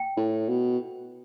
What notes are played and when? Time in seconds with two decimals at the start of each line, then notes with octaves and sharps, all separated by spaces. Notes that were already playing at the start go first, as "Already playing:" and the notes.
Already playing: G5
0.17 A2
0.49 B2